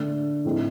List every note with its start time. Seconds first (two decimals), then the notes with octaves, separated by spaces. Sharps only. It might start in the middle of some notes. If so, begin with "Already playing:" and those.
Already playing: D3 A3 D4
0.44 A2 F3 A3 C4 D#4